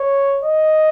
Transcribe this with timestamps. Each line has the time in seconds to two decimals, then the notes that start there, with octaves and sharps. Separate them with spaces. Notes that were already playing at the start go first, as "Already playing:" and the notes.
Already playing: C#5
0.43 D#5